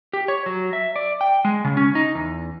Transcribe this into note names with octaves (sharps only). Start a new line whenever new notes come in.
G4
C#5
F#3
E5
D5
G5
G#3
C#3
C#4
D#4
E2